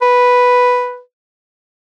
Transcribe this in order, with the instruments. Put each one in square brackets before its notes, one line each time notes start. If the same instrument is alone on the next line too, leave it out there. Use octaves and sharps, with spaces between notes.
[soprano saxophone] B4